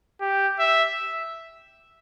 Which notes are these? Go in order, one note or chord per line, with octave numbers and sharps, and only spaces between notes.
G4
E5